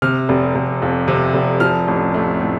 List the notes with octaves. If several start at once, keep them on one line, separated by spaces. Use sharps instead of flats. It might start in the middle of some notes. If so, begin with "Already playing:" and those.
C3 F6
F1
F1
F2
C3
F1
F3 F6
A1
A3
A2